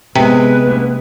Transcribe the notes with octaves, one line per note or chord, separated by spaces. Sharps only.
C3 G#3 B3 C4 B4
A#3 C#4